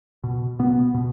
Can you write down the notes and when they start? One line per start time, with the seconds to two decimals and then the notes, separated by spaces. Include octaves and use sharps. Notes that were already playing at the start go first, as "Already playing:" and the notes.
0.24 B2
0.59 B2 B3
0.94 B2